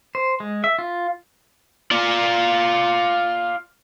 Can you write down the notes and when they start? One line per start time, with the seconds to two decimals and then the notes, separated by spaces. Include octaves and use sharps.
0.15 C5
0.40 G#3
0.64 E5
0.79 F4
1.91 F4 D5